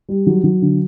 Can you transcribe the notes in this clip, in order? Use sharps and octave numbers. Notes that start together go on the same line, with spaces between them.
G3
F#3
F#3
D3